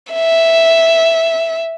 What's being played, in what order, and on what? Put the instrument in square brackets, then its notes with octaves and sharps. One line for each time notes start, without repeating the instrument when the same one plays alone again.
[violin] E5